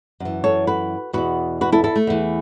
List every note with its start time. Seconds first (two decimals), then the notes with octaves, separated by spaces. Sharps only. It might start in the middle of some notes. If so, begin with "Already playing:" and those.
0.20 F#2 E3
0.44 A4 C#5
0.67 F#4 B4
1.13 E2 B2 F#4 B4
1.61 F#4 B4
1.72 E4 A4
1.84 E4 A4
1.96 A3
2.07 E2 E3